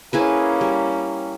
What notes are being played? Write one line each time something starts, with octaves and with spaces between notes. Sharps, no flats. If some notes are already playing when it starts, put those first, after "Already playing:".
A#3 C#4 E4 G#4 B4
G3